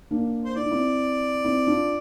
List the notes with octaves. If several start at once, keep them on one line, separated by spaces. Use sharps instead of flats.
A#3 D4
C5
E4 D5
D4
C4 E4
C4 E4
D4 F4